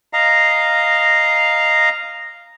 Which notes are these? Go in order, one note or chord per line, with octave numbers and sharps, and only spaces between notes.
D#5 F5 A#5